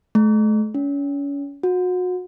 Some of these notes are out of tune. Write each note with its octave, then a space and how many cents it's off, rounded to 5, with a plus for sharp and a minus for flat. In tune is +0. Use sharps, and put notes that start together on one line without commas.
A3 -40
C#4 +35
F#4 -30